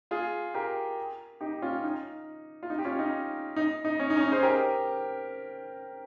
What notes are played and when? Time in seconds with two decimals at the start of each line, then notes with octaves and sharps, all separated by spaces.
0.11 F4 G#4
0.54 G4 A#4
1.41 D#4 G4
1.62 C#4 F4
1.83 D#4
2.63 F4
2.70 D#4
2.79 G4
2.85 C#4 F4
2.99 D#4
3.56 D#4
3.85 D#4
4.00 C#4
4.10 D#4
4.17 C#4
4.21 D#4
4.31 G#4 C5
4.43 G4 A#4